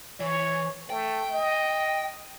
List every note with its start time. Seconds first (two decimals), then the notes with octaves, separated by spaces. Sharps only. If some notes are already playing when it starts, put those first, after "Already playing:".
0.20 E3 C#5
0.90 A3 G5
1.32 D#5